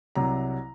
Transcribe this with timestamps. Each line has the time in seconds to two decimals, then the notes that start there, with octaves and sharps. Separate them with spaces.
0.15 C2 C3 F#3 A#5